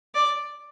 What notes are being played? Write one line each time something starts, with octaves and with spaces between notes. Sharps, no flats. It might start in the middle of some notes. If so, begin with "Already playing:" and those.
D5